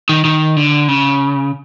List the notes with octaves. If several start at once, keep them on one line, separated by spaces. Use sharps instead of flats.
D#3
D#3
D3
C#3